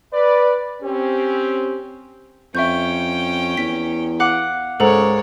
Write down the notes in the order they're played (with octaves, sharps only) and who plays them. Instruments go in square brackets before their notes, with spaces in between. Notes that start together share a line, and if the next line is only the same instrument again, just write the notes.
[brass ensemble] B4 D5
C4 C#4 G4
[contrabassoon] F2 [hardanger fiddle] C#4 G5 [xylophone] E5 C#6 G6
[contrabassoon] E2 [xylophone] B6
[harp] F5 F#5 D6
[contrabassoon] C#2 [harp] G#2 [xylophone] A4 F#5 A#5 [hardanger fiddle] A#4 C#5